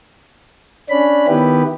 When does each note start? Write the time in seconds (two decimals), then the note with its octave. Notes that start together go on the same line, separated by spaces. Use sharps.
0.90 C#4 D4 B5
1.28 D#3 B3 E4 G4 B4